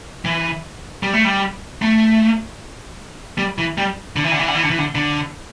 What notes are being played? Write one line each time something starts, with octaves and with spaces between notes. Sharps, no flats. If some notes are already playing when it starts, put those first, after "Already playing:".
E3
G3
A3
G3
A3
G3
E3
G3
D3
E3
D3
E3
D3
E3
D3
E3
D3
D3